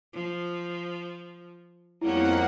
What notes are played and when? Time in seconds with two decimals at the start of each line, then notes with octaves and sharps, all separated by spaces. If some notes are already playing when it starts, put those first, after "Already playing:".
0.13 F3
2.02 F2 G3 A#3 B3 C#4 E4 F#5